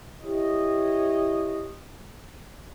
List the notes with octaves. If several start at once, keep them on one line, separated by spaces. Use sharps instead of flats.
E4 G4 C#5 D#5